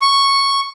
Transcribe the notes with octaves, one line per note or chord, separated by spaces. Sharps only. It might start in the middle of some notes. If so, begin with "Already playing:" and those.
C#6